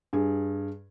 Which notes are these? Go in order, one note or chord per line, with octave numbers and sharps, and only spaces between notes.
G2 G#4